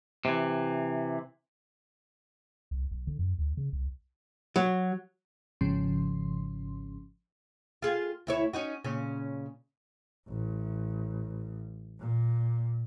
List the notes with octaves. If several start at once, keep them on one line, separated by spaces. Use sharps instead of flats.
C3 E3
C2
B1
D3
F#2
D2
C#3
C2
F#3
G#1 G#2 C#3 F3 C#4 C6
F4 G#4
D2 E4 C#5
C#4 D#4 F#4
A#2 C#3 C#4
A1
A#2